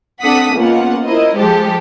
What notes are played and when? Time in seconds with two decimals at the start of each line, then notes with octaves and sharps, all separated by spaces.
0.23 C4 D4 A4 F#5 D#6 B6
0.55 C#2 A#3 B3 F4 F#5
1.05 E4 A#4 C5 D#5
1.36 F3 G#3 G4 A4 C5